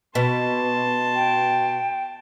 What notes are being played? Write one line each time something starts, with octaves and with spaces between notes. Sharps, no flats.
B2 A5 C6
G5